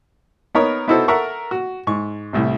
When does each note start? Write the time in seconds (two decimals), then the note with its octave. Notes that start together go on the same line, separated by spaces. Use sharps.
0.55 B3 D#4 A#4 C#5
0.88 B3 D#4 E4 F#4 A4 C5
1.08 A4 A#4 E5 F#5 C#6
1.51 F#4
1.87 G#2 C#6
2.33 C2 A2 C3